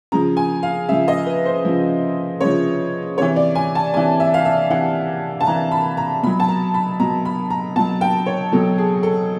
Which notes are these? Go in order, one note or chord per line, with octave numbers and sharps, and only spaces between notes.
C#3 F3 A#5
G#5
F5
C#3 F3 E5
D#5
B4
C5
C#3 F3
C#3 F3 C#5
C3 E3 C#5
D5
G#5
A5
C3 E3 G#5
E5
F5
E5
C3 E3 F#5
A5
C3 E3 A#5
B5
A#5
B2 F#3 B5
A5
A#5
B5
B2 F#3 A#5
B5
A#5
B2 F#3 A5
G5
C#5
B2 F#3 A4
G#4
A4